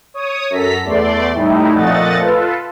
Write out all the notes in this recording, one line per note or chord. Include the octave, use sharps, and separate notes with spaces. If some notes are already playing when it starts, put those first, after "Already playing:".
C#5 D#6
F#2 A4 A#5 B6
E2 A3 D5 C6
A2 G3 A3 D#4 E4
F2 A#2 A3 D#5 F#5 A6
F4 A4 B4